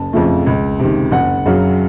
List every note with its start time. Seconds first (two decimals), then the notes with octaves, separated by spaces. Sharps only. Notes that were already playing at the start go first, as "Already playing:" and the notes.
Already playing: F#1 A5
0.13 F2 C#3 F3 A3
0.47 C#2
0.79 C3 D#3
1.11 F#1 F#5
1.46 F#2 C#3 F#3